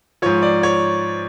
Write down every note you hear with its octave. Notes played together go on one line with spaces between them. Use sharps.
G#2 F3 C#5
D5
C#5